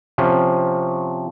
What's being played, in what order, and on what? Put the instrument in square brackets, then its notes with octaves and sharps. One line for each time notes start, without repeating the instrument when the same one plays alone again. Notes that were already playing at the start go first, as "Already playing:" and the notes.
[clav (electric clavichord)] C3 F3 C#4